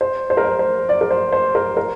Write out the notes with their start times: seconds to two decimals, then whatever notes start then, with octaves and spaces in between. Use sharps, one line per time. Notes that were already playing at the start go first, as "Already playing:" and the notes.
0.01 C5
0.30 C5
0.37 A#4
0.44 C5
0.59 C5
0.89 D5
1.01 A#4
1.11 C5
1.33 C5
1.55 A#4
1.77 A#4